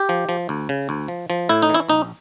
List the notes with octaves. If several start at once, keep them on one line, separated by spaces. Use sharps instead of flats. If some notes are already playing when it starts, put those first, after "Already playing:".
Already playing: G4
F3
F3
D2
C#3
D2
F3
F3
A2 E4
D#4
E3
E4
A#1 D#4